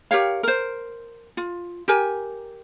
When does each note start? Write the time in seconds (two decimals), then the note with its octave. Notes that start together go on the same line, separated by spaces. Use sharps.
0.11 G4 A#4 C#5 F5
0.43 A#4 C5
1.37 F4
1.88 G4 A#4 G#5